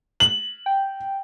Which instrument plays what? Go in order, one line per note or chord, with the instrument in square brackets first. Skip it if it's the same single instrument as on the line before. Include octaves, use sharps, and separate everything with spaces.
[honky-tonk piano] F#7
[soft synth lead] G5